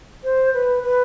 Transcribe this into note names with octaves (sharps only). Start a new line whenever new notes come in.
C5
B4
B4